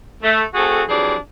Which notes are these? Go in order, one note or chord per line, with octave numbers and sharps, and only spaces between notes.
A3
A3 C4 F#4 G#4 A4
F2 E3 F#3 D4 G4 G#4